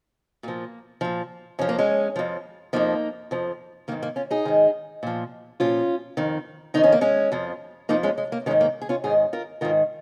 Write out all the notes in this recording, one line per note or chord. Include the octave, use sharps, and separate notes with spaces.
A#2 F3 A#3
A#2 F3
F2 F3 C#4
A#3
G#3 C#4
F2 F3
F2 F3 A#3 D#4
F2 F3
G#2 D#3 A#3
A#3
C#4 F4
D#4 G#4
G#2 D#3
A#2 F3
A#2 F3 C#4 F4
F2 D#3
F2 D#3 D#4
C#4
A#3
G#3 C#4
F2 F3
F2 F3 A#3 D#4
G#3 C#4
G#3
A#3
G#2 D#3 G#3 C#4
A#3
G#4
C#4 F4
G#2 D#3 D#4 G#4
F4 A#4
G#2 D#3 F4 A#4